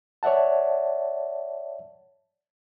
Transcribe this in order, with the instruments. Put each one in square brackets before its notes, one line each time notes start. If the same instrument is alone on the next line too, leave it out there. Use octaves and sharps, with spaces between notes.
[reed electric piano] C#5 D5 E5 F#5 A5